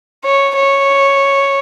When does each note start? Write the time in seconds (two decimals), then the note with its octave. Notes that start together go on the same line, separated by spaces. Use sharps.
0.24 C#5
0.56 C#5